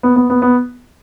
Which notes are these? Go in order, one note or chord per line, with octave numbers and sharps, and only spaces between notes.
B3
B3
B3
B3